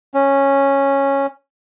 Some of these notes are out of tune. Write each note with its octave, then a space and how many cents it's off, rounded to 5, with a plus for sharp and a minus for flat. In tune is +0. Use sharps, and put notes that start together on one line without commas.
C#4 -10